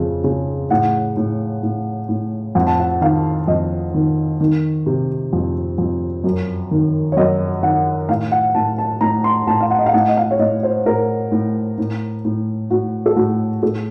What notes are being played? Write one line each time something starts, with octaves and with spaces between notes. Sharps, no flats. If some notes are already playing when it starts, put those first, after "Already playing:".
Already playing: F2 C#3
C#3
A2 F#5
A2
A2
A2
F2 F#5
A5
F#5
D#3 F5
F2 D#5
D#3
D#3
C3
F2
F2
F#2
D#3
C#5
F#2 D#5
D#3 F#5
A2 F5
F#5
A2 A5
A5
A2 A#5
C6
A2 A5
F5
F#5
D#5
F5
A2 F#5
D#5
F5
C#5
A2 D#5
C5
A2 A#4
A2
A2
A2
A2 F#4
A4
A2 F#4
A2 A4